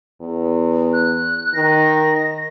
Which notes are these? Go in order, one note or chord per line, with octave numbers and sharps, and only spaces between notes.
E2
F#6
D#3 A#6